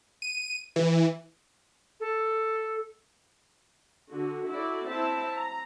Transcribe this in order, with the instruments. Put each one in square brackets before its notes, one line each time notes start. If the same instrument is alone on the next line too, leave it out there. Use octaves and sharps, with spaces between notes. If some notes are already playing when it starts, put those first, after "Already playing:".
[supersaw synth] D#7
E3
[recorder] A4
[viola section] D3 F#4
E4 F#4 A4 D5
C4 E4 E5 A5
A#5